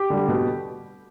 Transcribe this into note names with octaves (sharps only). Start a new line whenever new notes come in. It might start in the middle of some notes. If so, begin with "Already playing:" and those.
Already playing: G4
D3 G3
B2